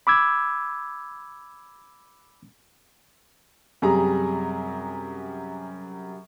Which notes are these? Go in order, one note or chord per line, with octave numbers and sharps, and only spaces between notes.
B5 D6 E6 G#6
F#2 C3 G3 G#4 A#5